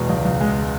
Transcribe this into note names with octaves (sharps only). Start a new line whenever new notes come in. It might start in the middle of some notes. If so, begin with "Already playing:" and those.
Already playing: E2 B2 G#3 A#5
C#2
C#2
G#3